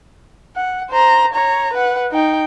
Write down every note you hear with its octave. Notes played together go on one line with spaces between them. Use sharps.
F#5
C5 A#5
C#5 A#5
B4 F#5
D#4 G5